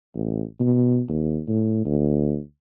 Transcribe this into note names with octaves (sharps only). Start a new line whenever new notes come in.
A1
B2
D#2
A2
D2